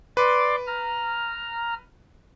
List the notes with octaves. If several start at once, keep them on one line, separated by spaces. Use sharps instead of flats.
B4 D5 C6 D6
A#5 F6